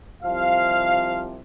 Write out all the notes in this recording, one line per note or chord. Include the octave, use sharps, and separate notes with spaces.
C2 C3 F3 F5